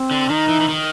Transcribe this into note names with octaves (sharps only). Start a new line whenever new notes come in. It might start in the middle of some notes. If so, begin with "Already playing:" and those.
Already playing: C4
D3
D#3 D#4
E3
E3
D#3